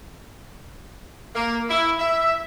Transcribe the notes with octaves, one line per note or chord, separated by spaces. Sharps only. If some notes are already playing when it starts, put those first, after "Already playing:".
A#3
E4
E5